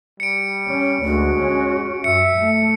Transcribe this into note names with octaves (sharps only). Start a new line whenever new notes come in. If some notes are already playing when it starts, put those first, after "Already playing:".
G3 C#7 D7
C#4
D2 G#3 F#4
C#4
F#2 E5 C#7
A3